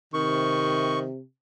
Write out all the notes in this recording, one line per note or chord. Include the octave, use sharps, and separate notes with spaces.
C3 D#3 C#6